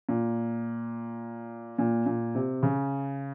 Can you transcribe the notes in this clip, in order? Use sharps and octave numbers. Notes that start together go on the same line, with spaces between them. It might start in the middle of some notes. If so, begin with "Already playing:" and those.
A#2
A#2
A#2
C3
C#3